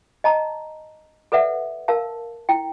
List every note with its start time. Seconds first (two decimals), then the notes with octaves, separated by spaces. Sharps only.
0.24 D#5 A5 A#5
1.32 A4 B4 D5 E5 F#5
1.88 A#4 F5 A5
2.49 E4 G5